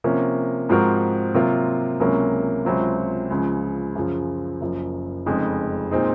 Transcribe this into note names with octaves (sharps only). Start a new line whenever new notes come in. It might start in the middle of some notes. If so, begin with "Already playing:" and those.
C3 F3 A#3 C#4
G#2 F3 C4 F#4 A#4
C3 F#3 A#3 F4 A#4
C#2 C3 F#3 A#3 C#4
C#2 C3 F#3 C4 F4
C#2 C#3 F3
F#2 C#3 F3
F#1 F#2 F3
F1 F2 C#3 G#3 D#4
A#2 G#3 C4 D#4